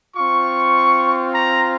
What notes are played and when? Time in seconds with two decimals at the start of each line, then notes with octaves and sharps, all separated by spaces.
0.15 C4 F4 C#6
1.35 A#5